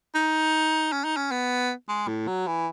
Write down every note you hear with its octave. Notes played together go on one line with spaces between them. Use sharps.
D#4
C#4
D#4
C#4
B3
G#3
A2
F#3
E3